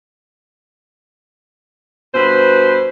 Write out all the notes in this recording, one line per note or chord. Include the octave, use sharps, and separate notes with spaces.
G2 B2 B4 C5